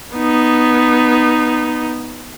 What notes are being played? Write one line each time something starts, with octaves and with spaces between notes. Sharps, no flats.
B3 D#4